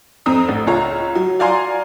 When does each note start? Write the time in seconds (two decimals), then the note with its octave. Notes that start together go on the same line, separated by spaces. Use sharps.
0.26 F2 C4 A#5 D#6
0.48 A1
0.67 C#2 F4 C#5 A#5
1.15 F#3
1.39 F#4 D5 F5 G#5 A#5 C6